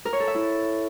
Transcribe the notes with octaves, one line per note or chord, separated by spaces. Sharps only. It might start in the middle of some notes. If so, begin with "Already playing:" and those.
A#4
C#5
A4
E5
E4